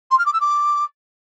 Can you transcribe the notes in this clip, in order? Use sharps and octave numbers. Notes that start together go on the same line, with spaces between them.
C6
F6
D6
E6
D6